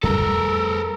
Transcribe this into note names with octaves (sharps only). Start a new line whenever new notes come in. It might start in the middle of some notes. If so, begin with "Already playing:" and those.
F2 G3 A3 A4 A#4 E6